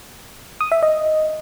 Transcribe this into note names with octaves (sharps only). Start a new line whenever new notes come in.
D#6
E5
D#5